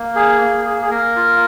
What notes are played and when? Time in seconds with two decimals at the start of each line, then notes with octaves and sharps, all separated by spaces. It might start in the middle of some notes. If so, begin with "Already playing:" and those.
Already playing: A#3
0.16 G#4
0.41 A#3
0.66 G#4
0.82 G#4
0.90 A#3 A#4
1.16 F4